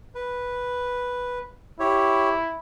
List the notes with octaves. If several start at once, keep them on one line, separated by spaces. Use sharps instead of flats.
B4
E4 G4 C#5